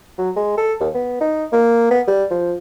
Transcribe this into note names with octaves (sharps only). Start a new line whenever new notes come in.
F#3
G#3
A4
D#2
B3
D#4
A#3
B3
G3
F3